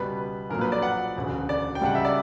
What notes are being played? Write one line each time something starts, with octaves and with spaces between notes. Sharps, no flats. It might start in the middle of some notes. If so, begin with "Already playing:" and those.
Already playing: C#2 B2 G3 B3 B4
A#1 A#2 F#3 A#3 A#4
B4
D5
F#5
E1 D2 C#3
D5
G5
C#2 C#3 G3 F#5
E5
D5